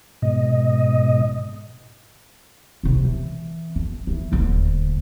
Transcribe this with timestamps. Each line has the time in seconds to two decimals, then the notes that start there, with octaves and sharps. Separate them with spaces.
0.22 G#2 B2 D#5
2.83 C#2 C3
3.05 E3
3.76 F2
4.07 D#3 E3
4.32 D#1 D2